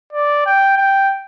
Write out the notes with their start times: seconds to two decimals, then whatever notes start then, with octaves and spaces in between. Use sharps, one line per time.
0.13 D5
0.46 G5
0.77 G5